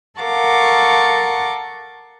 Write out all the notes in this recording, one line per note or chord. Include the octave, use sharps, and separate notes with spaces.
A4 A#4 F5 F#5 C#6 D6